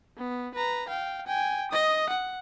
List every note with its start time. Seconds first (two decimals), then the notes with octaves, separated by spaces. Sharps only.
0.17 B3
0.54 B4 A#5
0.88 F5 G5
1.27 G5 G#5
1.71 D#5 D#6
2.09 F#5